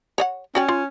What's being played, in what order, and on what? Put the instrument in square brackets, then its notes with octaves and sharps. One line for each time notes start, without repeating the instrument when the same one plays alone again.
[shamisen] C#5 D#5 F#5
[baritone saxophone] C#4 [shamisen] F#4 D5 G5
[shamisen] F4